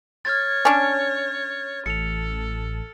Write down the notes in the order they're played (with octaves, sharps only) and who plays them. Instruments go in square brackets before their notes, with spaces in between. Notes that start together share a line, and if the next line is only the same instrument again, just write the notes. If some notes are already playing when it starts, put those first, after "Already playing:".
[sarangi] C#5 [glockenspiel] F6 G#6 A6
[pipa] C#4 D4 [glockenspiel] A6
[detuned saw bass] A1 [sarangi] A4 [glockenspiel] C#7 F7